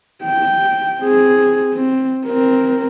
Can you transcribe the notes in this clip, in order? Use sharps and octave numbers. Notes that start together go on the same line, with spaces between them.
G5
C4 G#4
C4
C4 A#4